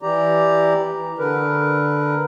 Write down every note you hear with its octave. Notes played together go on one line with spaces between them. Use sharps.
E3 G4 D5 A#5
D3 A#4 B4